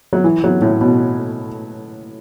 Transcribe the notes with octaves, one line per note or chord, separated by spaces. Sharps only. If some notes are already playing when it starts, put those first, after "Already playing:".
F#3
E3
F#3
A2
B2